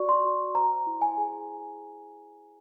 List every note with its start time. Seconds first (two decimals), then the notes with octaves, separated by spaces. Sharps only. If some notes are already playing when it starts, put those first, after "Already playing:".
Already playing: F#4 D5 C#6
0.09 C6
0.24 F#4
0.55 C5 A#5
0.87 E4
1.02 G#5
1.17 G#4